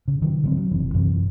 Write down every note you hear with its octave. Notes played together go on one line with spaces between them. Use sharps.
C#3
D#3 F#3
D3 F#3 C4
F#3
F#1 C3 E3
F#2 C3 E3 C4